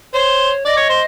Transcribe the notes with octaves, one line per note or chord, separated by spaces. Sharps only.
C5 C#5
D5 D#5
C#5
C5